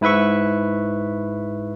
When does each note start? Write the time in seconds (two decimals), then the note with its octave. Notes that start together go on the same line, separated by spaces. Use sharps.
0.01 G#2 E4 B4 E5 C#6